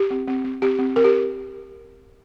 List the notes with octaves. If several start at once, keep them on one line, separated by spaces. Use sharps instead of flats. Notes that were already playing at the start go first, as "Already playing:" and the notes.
Already playing: G4
C4
C4
C4
C4 G4
C4
C4 A#4
G4